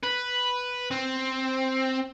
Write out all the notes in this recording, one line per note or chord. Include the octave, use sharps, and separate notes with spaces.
B4
C4